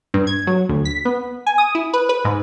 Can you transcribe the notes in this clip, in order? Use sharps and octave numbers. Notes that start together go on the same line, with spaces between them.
G2
G#6
F#3
D2
B6
B3
G#5
D#6
E4
B4
B4
G#2